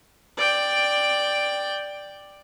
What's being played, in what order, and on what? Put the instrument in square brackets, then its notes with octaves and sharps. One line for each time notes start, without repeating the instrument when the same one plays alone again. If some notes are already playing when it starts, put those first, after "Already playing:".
[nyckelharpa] D5 G5